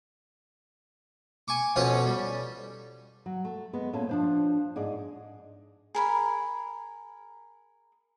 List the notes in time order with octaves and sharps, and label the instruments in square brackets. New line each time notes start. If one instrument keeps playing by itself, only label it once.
[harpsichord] G#5 C#6 D6
F2 B2 C#4 C#5 D#6
G3
[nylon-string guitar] F#3
A3
G#3 B3
A#2 C#4 A4 E5 A5
F3 D4 C5
G#2 G#4 D5
[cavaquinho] G#4 A#4 B5